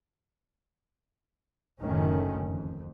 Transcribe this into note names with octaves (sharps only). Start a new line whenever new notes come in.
F#1 D2 A2 D#3 A3 C#4
F2